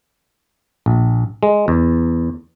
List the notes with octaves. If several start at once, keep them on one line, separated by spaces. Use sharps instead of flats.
A#1
G#3
E2